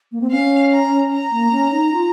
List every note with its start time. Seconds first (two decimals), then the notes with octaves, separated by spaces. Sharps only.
0.11 A#3
0.21 C4
0.30 C#4 F5
0.72 A#5
1.11 A#5
1.31 A#3
1.51 C#4
1.71 D#4
1.92 F4